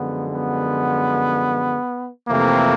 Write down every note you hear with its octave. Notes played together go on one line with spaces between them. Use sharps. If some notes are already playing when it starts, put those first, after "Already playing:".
Already playing: F#2 D3 F3 G#3 B3
B3
F2 C3 E3 A3 A#3